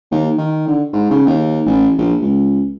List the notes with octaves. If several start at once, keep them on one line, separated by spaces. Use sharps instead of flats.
D#2
D#3
D3
G#2
C#3
D#2
A1
A#1
C#2